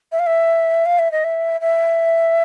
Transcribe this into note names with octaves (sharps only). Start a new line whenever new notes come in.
E5
F5
E5
F5
E5
D#5
E5
E5